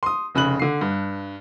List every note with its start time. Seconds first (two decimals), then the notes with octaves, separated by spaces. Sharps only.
0.03 C6 D#6
0.35 F1 C#3 B5 F#6 F#7
0.59 D3 C7
0.81 G2